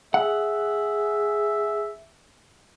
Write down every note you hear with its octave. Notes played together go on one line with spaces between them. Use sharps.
G#4 E5 F#5